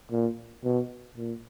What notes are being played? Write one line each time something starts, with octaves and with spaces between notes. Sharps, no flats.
A#2
B2
A#2